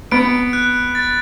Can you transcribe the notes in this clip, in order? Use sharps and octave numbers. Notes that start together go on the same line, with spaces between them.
B3 D7
F#6
A6